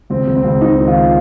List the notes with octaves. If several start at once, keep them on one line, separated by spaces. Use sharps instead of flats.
C#2 C4
C#2
C4
C#2
C#2 D#4
D#3
F4